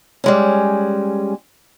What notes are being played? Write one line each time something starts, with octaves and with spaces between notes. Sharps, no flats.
G3 G#3 C#4